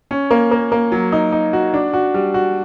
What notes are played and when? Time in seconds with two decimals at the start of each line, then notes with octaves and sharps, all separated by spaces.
0.11 C#4
0.31 A#3
0.51 A#3
0.72 A#3
0.92 F#3
1.12 D#4
1.32 D#4
1.53 F#4
1.74 D4
1.94 F#4
2.14 G3
2.34 F#4